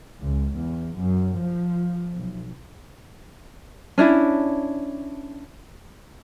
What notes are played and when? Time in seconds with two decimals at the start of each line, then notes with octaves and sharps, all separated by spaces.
0.24 C#2
0.56 E2
0.98 F#2
1.40 F3
2.13 B1
3.98 C#4 D4 E4